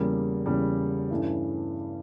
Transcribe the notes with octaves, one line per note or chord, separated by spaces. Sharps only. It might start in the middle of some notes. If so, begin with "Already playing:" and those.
Already playing: E2 C#3 G3 A#3
E2 C#3 G3 A#3
G2 E3 A3 C#4 E4